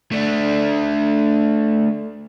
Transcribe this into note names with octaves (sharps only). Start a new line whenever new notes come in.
A3 D4